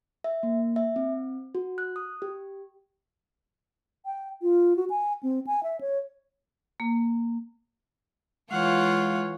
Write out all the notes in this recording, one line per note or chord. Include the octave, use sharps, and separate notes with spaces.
E5
A#3
E5
C4
F#4
F#6
D#6
G4
G5
F4
F#4
G#5
C4
G#5
E5
C#5
A#3
E3 G#3 F4 C#5 F5 F#5